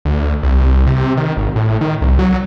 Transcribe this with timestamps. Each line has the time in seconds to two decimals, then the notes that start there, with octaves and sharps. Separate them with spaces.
0.05 D2
0.43 C2
0.87 C3
1.17 D#3
1.37 G#1
1.56 A2
1.81 D#3
2.01 C2
2.19 F#3